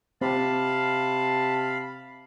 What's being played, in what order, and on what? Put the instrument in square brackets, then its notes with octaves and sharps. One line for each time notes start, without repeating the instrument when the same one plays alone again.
[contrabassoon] C3 [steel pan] C4 [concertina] F5 B5 [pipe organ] A5